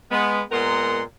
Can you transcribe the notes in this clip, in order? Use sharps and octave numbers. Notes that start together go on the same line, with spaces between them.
G#3 B3
A#2 G#3 B3 A#4 F#5 C6